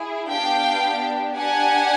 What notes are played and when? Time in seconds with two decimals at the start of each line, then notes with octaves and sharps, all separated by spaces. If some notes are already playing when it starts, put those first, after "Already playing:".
Already playing: E4 G#4
0.29 B3 D4 G4 F5 G5
1.37 D4 G4 F#5 G#5